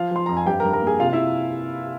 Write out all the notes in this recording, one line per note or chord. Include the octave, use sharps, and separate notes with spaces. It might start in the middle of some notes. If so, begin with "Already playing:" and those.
Already playing: F3 F4 F5
F3 C6
F2 A#5
G#5
G2 G4 G5
A#4 A#5
G2
A#4 A#5
A#3 G#4 G#5
C3 F4 F5
F5
E4 E5